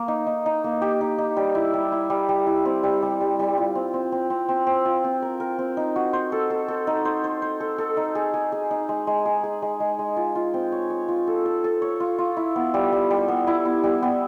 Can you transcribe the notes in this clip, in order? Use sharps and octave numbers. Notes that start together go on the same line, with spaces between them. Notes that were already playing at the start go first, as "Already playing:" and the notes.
Already playing: A#3
D#4
D#4
D#4
A#3
G4
D#4
D#4
G3
E4
G3
E4
G3
G3
E4
C4
G3
G3
G3
G3
F4
C4
C4
C4
C4
C4
C4
F4
C4
A#4
A#4
C4
D#4
F#4
C5
A4
A4
A4
D#4
C5
C5
C5
A4
A4
D#4
G#4
G#4
G#4
D#4
G#3
G#3
G#4
G#4
G#3
G#3
G#3
F4
F4
C4
C#5
C#5
F4
A4
A4
A4
C#5
F4
F4
E4
B3
G3
G3
G3
B3
E4
B3
G3
B3